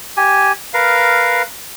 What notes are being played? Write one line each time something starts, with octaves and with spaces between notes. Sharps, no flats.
G4 G#5
A#4 B4 F5